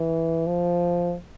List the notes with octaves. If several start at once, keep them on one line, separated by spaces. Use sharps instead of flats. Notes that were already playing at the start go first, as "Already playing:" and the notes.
Already playing: E3
F3